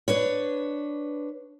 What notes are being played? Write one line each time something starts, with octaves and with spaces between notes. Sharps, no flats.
D4 B4 C#5